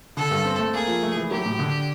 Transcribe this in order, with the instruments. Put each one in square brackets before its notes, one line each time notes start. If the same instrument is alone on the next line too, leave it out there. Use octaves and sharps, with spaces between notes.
[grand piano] D3 [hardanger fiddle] A4
[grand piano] G2
C4
A3
[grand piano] A#3 [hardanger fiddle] G#4
[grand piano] F3
A3
E3
[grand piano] F#3 [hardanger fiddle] G4
[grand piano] A2
D3